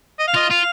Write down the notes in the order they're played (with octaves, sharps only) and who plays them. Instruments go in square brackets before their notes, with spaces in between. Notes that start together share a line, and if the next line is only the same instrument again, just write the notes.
[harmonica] D#5
F5
[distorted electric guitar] F4 [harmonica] D#5
[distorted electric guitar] F4 [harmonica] F5